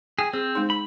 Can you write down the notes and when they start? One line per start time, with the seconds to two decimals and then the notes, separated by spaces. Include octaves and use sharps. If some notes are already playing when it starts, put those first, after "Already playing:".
0.19 G#4 G5
0.33 C4 G#4
0.55 G#3 D#4
0.70 B5